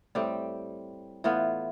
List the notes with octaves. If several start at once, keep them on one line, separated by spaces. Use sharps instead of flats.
A2 G3 C4 G4
A2 E3 B3 F4